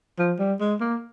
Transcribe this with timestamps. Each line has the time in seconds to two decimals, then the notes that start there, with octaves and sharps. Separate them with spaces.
0.19 F3
0.39 G3
0.60 G#3
0.81 A#3